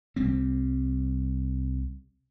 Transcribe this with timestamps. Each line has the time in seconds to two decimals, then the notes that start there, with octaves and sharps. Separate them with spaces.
0.16 C2 G3 C4